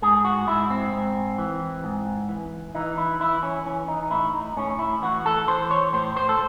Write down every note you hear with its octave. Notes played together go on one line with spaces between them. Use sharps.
G#2 G#4
F#4
G#2 E4
C4
G#2
E3
G#2
E3
E3 D#4
E4
E3 E4
C#4
E3 C#4
D#4
D#4
A2 E4
D#4
A2 C#4
E4
E3 F#4
A4
E3 C5
C#5
A2 C5
C5
A4